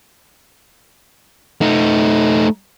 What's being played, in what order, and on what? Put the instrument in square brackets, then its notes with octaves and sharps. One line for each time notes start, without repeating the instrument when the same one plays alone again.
[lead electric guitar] A3 D#4